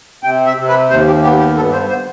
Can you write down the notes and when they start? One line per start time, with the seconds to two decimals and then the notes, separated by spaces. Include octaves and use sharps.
0.24 C3 G5
0.46 E5
0.57 C3
0.68 B4
0.90 D#2 C5
1.07 G4
1.23 B3 G4
1.39 G4
1.56 G2 A4
1.73 C5
1.89 C5